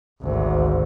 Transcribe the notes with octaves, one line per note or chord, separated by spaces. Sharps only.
G#1 D2